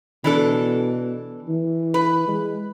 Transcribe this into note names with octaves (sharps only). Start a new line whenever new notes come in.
B2 E3 D4 A4
E3
B4
G#3